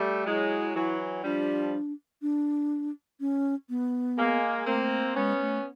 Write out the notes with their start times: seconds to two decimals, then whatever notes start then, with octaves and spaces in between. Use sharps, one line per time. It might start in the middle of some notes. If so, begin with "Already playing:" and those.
Already playing: G3 A3
0.26 F#3 G#3 E4
0.76 E3 F#3
1.24 F3 G3 D4
2.22 D4
3.20 C#4
3.69 B3
4.18 G#3 A#3
4.66 A3 A#3 C4
5.16 G#3 B3 C#4
5.41 A3